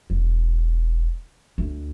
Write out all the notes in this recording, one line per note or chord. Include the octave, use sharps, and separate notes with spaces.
E1
D2